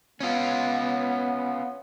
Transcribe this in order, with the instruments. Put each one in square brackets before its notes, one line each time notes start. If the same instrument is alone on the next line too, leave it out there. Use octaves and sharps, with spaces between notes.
[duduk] B3 [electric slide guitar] C#4 F4